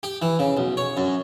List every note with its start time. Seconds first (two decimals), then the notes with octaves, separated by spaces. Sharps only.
0.03 G4
0.22 E3
0.39 C#3
0.57 B1
0.77 C#5
0.97 F#2